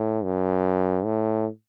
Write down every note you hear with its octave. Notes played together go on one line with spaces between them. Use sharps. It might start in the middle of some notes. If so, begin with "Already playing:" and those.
Already playing: A2
F#2
A2